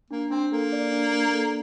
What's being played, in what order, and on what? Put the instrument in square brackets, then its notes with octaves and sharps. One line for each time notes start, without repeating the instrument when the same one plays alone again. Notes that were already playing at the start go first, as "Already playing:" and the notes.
[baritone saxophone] A#3 [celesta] D4
[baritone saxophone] C4 [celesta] D4
[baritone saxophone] A#3 [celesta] A4
[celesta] D5
D4
D4
A4